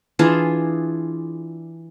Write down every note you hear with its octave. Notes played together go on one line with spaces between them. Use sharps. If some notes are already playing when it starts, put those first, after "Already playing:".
E3 D4 F4 G#4